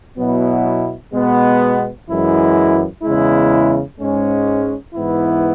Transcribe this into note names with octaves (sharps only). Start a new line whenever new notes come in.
B2 F#3 B3 E4
B2 G#3 B3
F#2 E3 G#3 E4
E2 C#3 G#3 E4
G#2 G#3 C#4
G#2 E3 B3 E4